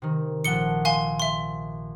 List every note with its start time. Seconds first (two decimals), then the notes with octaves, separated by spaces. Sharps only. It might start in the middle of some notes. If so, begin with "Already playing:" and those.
0.02 C3 D#3
0.44 A#1 A4 F#5 C#7 G7
0.85 F5 G#5 C6
1.20 E5 C6